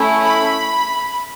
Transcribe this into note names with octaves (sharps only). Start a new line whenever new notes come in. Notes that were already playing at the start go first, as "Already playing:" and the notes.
Already playing: A3 C#4 E4
B5